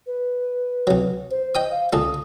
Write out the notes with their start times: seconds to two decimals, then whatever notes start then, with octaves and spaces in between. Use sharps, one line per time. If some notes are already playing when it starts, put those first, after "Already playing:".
0.06 B4
0.87 C2 F#3
1.30 C5
1.55 D#5 G5 D#6
1.70 F5
1.93 C#2 A#2 A4 D#6